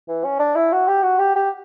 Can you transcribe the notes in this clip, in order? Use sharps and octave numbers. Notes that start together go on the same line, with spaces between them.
E3
C#4
D4
E4
F#4
G4
F#4
G4
G4